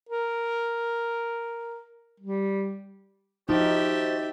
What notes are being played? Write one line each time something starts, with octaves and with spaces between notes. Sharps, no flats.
A#4
G3
F3 D#4 F#4 G4 C5 E5 A6